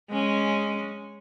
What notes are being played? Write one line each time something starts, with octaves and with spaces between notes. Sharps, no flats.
G#3 C#4